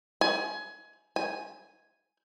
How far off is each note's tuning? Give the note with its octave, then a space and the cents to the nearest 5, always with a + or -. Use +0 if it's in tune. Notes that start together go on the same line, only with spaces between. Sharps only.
G#5 +20
G#5 +0